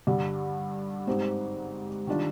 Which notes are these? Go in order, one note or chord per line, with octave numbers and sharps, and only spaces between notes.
G2 D3 G3
G#2 G3 C4 D#4
D#3 G3 D4 F4